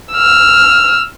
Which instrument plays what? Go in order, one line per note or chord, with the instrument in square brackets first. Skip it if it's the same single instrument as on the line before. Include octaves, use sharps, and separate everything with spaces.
[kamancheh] E6 F6